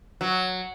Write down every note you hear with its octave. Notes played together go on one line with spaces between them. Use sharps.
F#3